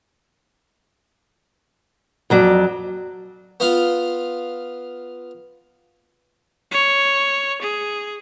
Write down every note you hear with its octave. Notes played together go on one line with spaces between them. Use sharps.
F2 F#3 D5
B3 F4 F5
C#5
G#4